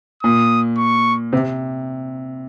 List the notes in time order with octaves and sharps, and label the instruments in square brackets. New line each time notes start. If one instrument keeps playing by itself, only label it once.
[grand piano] A#2 [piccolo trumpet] D#6
[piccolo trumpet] C#6
[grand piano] C3